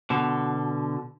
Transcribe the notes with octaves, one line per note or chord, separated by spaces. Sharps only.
B2 D3